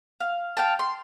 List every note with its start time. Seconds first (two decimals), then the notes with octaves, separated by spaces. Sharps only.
0.20 F5
0.57 F5 G5 A5
0.79 C6